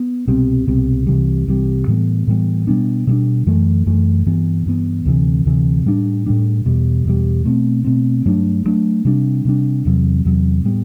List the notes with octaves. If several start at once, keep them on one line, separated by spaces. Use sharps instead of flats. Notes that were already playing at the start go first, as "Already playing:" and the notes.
Already playing: B3
C2 B2 G3 C4
C2 B2 G3 C4
C2 C3 E3 G3
C2 C3 E3 G3
A2 E3 G3 B3
A2 E3 G3 B3
B2 G3 B3 D4
B2 G3 B3 D4
F#2 E3 A3
F#2 E3 A3
G2 E3 B3
G2 E3 B3
D2 C3 E3
D2 C3 E3
A2 G3 D4
A2 G3 D4
E2 B2 G3
E2 B2 G3
B2 A3 C4
B2 A3 C4
G2 F#3 A3 D4
G2 F#3 A3 D4
C3 G3 D4
C3 G3 D4
E2 C3 F#3
E2 C3 F#3
A2 G3 B3